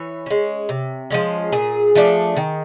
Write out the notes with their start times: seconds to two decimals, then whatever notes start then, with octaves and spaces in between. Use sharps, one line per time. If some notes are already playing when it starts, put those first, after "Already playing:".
Already playing: E3 C#5
0.26 G#3 C#4
0.69 C3
1.10 F3 G#3 C#4
1.52 A#2 G#4
1.95 F3 A3 D4
2.37 D#3